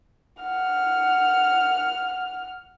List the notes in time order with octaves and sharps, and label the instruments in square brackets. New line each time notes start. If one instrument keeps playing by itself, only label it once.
[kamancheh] F#5 F6